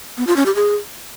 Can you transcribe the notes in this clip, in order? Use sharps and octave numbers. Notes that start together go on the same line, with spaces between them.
B3
F4
C#4
G4
G#4